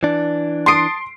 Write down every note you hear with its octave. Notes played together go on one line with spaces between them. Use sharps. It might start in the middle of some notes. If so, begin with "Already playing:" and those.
E3 D4
A5 C6 D#6 C7 D7